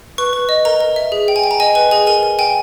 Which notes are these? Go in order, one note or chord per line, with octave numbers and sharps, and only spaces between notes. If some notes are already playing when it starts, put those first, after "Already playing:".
B4 C#6
B4
D#5
A#4 A#5
A#4
E5
G#4
G5
G#5
G5
A#5
D#5 G#5
B4 G#5
G#4 G#5
A#4 G#5
A#4
G5 G#5